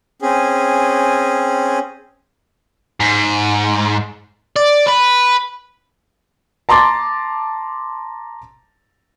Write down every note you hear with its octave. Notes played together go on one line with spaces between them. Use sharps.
C4 C#4 G#4
G#2
D5
B4
A5 A#5 C6 D6 A6